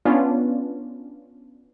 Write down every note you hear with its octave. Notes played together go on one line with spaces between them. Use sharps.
B3 C#4 D4 F4